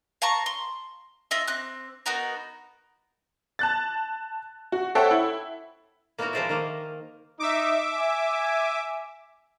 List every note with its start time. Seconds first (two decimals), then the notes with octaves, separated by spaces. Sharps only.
0.22 F5 A5 A#5 C#6
0.46 C6
1.31 F4 D#5 E5
1.47 C4 D6 F#6
2.06 B3 D#4 F#4 A#4
3.59 A5 F#6 A6
4.72 F#4
4.95 A4 C5 C#5 E5 F#5 G5
5.11 E4
6.18 A#3 B3 D#4 E4 F#4 A#4
6.33 F3 G#3 A#4 C5 D5 E5
6.49 D#3 A#3
7.40 D#4 E5 D6
7.92 G#5